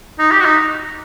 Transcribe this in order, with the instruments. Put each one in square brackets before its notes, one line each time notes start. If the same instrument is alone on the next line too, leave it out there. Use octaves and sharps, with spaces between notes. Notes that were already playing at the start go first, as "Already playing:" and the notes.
[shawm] D#4
G4
F#4
D#4